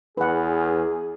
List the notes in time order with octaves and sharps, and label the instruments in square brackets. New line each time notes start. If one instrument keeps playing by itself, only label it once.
[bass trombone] E2 [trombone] G#4 [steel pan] B4 F#5